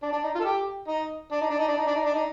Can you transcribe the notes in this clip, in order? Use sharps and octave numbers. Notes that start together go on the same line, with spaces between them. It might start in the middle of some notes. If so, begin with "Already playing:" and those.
D4
D4
D#4
F4
A4
G4
D#4
D4
D#4
D4
D#4
D4
D#4
D4
D#4
D4
D#4